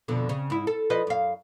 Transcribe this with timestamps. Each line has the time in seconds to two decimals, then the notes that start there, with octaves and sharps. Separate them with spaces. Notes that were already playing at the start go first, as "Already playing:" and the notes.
0.08 F2 B2 D3
0.29 C#3
0.50 G#2 E4
0.67 A4
0.90 F3 B4 D#5
1.07 F#2 F5